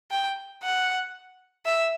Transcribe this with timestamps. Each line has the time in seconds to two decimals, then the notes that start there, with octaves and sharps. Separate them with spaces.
0.11 G5
0.63 F#5
1.65 E5